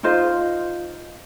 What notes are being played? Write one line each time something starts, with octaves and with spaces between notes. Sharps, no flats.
D#4 F4 C5 D#5